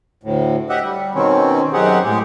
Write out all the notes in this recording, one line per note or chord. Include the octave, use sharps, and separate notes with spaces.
D2 A2
G4 D#5 E5 F#5
G3
B2 D#3 C4 C#4
F#2 C4 D#4 G4 G#4 F#5
A2 G#3 G4 G#4